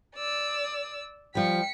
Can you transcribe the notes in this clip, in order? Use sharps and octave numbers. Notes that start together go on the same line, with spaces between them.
D5 E6
F3 G3 G5 B6 C#7